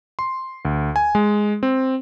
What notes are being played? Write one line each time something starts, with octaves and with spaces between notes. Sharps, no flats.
C6
D2
G#5
G#3
C4